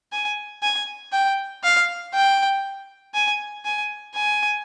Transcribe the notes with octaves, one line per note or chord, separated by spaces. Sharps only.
G#5
G#5
G5
F5
G5
G#5
G#5
G#5